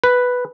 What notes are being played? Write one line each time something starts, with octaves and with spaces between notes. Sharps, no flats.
B4